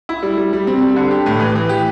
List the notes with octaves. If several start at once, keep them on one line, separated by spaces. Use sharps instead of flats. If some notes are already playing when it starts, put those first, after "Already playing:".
E4
G3
G3
G3
C4
G3
D3
G4
A2
E3
E3
G4